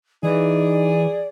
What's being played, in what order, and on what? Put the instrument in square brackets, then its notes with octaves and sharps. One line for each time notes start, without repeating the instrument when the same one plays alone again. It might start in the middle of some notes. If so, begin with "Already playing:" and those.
[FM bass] E3 [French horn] D#4 [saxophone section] G#4 [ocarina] D5